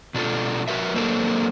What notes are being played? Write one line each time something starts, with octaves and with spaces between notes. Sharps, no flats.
B2 D4 F4 G#4 A4
F#4 A#4 B4 E5
F#3 A#3 C4 D4 A4 A#4